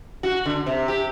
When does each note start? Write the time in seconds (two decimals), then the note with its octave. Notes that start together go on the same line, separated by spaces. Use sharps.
0.23 F#4
0.46 D3
0.66 C3
0.88 G4